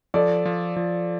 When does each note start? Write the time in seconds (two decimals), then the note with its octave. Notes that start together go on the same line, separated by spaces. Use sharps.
0.14 F3 A4 D5
0.45 F3
0.76 F3